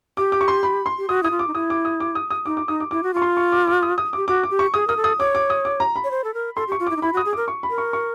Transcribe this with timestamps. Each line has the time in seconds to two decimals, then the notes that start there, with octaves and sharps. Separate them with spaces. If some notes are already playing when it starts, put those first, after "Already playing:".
0.17 G4 D6
0.32 D6
0.41 C#6
0.48 C6
0.63 B5
0.86 C6
0.98 G4
1.09 F#4 D#6
1.23 E4 D#6
1.31 F4
1.39 D6
1.47 D#4
1.55 E4 D#6
1.70 D6
1.85 D#6
2.00 D6
2.15 D#6
2.30 D#6
2.46 D#4 D6
2.57 D6
2.68 D#4 D#6
2.80 D6
2.91 E4 D6
3.03 F#4
3.14 F4 C#6
3.22 C6
3.37 C#6
3.52 D6
3.67 D6
3.83 D#6
3.98 D#6
4.13 G4 D6
4.28 F#4 D6
4.43 D6
4.51 G4
4.59 C#6
4.74 G#4 D#6
4.87 A#4 D#6
4.97 A4
5.04 D#6
5.19 C#5 D6
5.35 D6
5.50 D#6
5.65 D6
5.80 A#5
5.96 B5
6.04 C#5
6.11 C5
6.24 A4
6.34 A#4
6.56 A4 C6
6.68 G4
6.72 C#6
6.80 F4
6.87 E4 D6
6.96 D#4
7.02 E4 B5
7.13 F#4
7.17 D#6
7.25 G#4
7.33 A#4 D6
7.48 C#6
7.63 B5
7.70 A#4
7.78 C#6
7.93 C#6